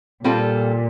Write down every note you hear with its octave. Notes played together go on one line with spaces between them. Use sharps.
A#2 G3 C4 F4 A4